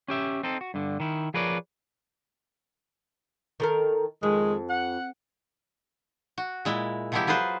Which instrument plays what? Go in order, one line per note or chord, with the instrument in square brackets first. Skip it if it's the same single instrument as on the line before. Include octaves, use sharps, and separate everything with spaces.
[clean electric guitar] C#4 G4 E5
C4 D#4 A4
F#4
G2 D3
D#3 E4
F3 G#4 A#4 B4 C#5 D5
[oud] D#3 A4 A#4
[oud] F2 [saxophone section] D#3 G#3
[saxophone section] F#5
[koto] F#4
A#2 G#3 E4
C3 F3 F#3 G#3 E4 G4
F#3 F4 G#4 B4 C5